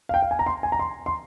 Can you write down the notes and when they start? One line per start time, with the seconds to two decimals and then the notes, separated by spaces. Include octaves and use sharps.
0.09 F5
0.14 G5
0.22 F5
0.31 G#5
0.39 A#5
0.46 C6
0.63 G#5
0.72 A#5
0.79 C6
1.06 C6